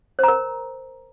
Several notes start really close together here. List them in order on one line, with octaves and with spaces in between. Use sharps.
C5 A#5 A#4